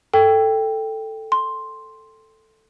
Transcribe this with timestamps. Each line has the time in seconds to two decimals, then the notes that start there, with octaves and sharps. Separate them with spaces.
0.14 A4 G5
1.32 C6